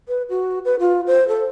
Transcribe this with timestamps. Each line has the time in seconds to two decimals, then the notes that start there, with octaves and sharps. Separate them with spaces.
0.08 B4
0.30 F#4
0.65 B4
0.80 F4
1.07 C5
1.28 A4